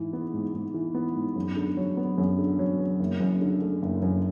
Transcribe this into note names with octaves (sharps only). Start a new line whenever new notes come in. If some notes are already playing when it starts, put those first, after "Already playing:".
Already playing: G#2 E3
B3
G#2
G#2
E3
B3
G#2
F#2
D3
F#3
B3
F#2
D3
F#3
B3
F#1
F#2
D3
A3
F#1
F#2